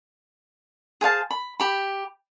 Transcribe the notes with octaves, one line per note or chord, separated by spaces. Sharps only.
G#4 C5 F5 A5
B5
G4 B5